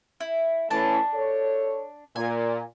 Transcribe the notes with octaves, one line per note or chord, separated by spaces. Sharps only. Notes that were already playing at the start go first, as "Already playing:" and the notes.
E4
E3 A3 C#4 D4 A5
A4 C#5
A#2 G#5